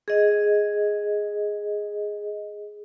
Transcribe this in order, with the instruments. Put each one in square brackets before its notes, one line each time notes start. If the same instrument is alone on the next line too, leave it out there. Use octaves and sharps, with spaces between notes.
[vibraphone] G#4 D#5